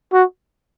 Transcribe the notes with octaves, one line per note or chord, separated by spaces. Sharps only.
F#4